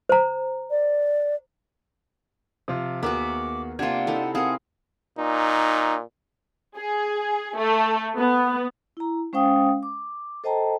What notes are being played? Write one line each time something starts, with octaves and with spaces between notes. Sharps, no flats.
C5 A#5
D5
C3 F3 F4
D#2 B3 F#4 G#4 A#4 E5 D6
C3 A#3 D4 F4 F#5 G#6
D#4 E4 A4
C4 G#4 A#4 F5 F#5
A#2 D#4
G#4
A3
B3
E4 A#5
G#3 C#4 C5 F5 G5 D#6
D6
A4 C5 D#5 G5 A5 A#5